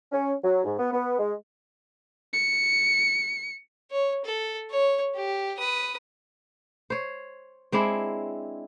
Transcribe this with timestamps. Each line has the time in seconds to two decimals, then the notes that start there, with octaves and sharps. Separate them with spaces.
0.13 C#4
0.44 F#3
0.64 G#2
0.79 B3
0.93 B3
1.19 G#3
2.33 C#7
3.91 C#5
4.24 A4
4.70 C#5
5.15 G4
5.58 B4 D#6
6.90 C5 C#5
7.72 G#3 C4 D4 E4